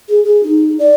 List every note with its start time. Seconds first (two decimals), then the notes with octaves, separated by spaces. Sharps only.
0.09 G#4
0.24 G#4
0.43 D#4
0.79 D5